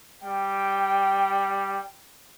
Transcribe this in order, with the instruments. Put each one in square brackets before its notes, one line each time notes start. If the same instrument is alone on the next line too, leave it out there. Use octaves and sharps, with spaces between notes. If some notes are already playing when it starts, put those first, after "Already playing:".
[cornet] G3 [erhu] G5